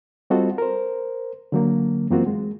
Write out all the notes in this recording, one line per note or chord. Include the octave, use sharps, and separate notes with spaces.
G3 C4 F4 F#4 A4 D#5
A#4 C5
D3 F#3 A#3
F#2 E3 A#3 C4 F4 F#4
G#3